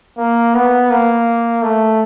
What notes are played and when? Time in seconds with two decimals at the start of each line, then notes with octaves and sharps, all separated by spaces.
0.18 A#3
0.54 B3
0.90 A#3
1.62 A3